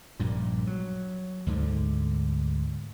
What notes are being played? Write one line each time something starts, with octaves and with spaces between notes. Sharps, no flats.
A#1 G2 A#2
F#3
D2 G#2 D3